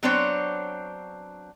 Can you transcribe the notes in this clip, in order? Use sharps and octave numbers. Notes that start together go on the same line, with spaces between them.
F#3 B3 C4 D4 C5 C#5